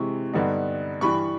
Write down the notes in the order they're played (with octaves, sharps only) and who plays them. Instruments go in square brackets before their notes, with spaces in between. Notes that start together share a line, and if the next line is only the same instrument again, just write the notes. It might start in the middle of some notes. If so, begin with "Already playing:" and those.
Already playing: [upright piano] C3 E3 G#3 C#6
G2 D3 G3 B3 D#4
G2 E3 G3 B5 C#6